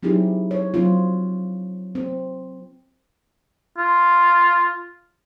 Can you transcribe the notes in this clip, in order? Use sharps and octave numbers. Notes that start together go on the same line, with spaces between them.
F#3 C4 D#4 E4 G4 G#4
C#5
F#3 C4 F4
C4
F4